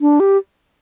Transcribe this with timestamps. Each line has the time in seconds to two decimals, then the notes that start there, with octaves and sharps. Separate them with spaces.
0.01 D4
0.20 G4